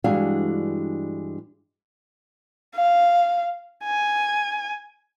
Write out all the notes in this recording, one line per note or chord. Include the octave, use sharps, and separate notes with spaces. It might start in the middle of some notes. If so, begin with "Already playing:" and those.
G2 E3 G#3 D4 F#4 F5
F5
G#5